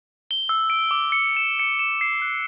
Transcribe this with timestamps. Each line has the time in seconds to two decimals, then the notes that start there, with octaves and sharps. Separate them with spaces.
0.31 G7
0.49 E6
0.70 D7
0.91 D6
1.12 C#7
1.37 E7
1.59 C#7
1.79 E7
2.01 C7
2.22 F#6